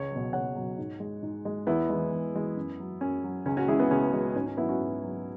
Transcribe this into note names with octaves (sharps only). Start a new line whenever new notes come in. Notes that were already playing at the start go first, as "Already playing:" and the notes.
Already playing: C#2 C#5
B2 F#3
C#2 C#5 F#5
B2 F#3
G#2
G#3
G#2
G#3
E2 B3 E4
E3 G#3
E2
E3 G#3
F#2
F#3
F#2 C#4
F#3
C#2 C#4
C#4 F#4
C#3 G#3 E4 G#4
B3
C#2 C#4
C#3 G#3
G#2 C#4
C#4
F#3 B3 E4
C#4 F#4
G#2
F#3